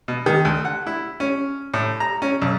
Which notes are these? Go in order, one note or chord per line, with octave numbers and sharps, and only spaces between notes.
B2
D#3
D2
F#5
E4
C#4
A2
A#5
C#4
B1